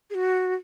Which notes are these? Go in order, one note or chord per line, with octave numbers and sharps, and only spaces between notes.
G#4
F#4